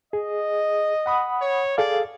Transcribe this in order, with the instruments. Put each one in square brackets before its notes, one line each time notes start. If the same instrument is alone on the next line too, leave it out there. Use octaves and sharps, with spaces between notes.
[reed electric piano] G#4 [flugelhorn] D#5
[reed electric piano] F#5 B5 D#6
[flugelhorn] C#5
[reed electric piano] G#4 A4 F5 [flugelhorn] D5